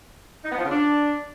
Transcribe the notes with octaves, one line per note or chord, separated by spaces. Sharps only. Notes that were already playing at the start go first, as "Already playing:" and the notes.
D#4
B3
F3
C#3
D4